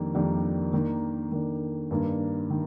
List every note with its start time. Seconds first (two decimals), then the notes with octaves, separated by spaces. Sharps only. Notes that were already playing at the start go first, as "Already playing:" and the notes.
Already playing: F2 D#3 G3 A#3 D4
0.15 F2 D#3 G3 A#3 D4
0.73 D#3 A#3 D4
1.32 D#3 A#3 D4
1.91 G2 D#3 A#3 D4
2.50 D#3